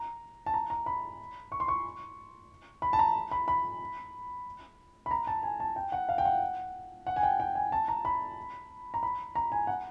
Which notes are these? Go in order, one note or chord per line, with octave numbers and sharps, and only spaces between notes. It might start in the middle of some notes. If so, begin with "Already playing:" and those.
Already playing: A#5
A5
A#5
A#5
B5
C#6
C6
C#6
B5
A5
A#5
B5
B5
B5
A#5
A5
G#5
A5
G5
F#5
F5
G5
F#5
F#5
G#5
G5
G5
G#5
A5
A#5
B5
A#5
B5
A#5
G#5
F#5